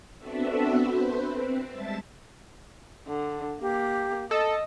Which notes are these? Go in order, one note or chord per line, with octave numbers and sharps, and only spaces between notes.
B3 C4 D4 F#4 A4 E5
B4 C5
C4
G3 G#3 E5 A5 A6
D3
A#3 G4
A4 D#5